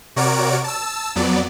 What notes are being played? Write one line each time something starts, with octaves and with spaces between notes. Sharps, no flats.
C3 F#4 A#4 C#5 D5 D7
A5 E6
F2 F#3 B3 D5